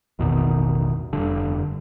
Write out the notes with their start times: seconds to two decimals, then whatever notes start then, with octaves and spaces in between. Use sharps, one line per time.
0.19 A1 E2 B2 D#3
1.13 F1 G2 D3